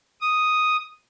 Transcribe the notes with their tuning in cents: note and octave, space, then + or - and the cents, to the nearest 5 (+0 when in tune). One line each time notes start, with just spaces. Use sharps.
D#6 +0